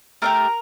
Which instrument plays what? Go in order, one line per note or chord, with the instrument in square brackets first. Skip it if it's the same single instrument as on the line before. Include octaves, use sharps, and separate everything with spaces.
[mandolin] A3 D4 G4 A#4 A#5